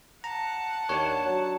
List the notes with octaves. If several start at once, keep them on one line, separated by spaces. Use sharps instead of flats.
F#5 A5 A#5
D#2 D4 C#5
F#3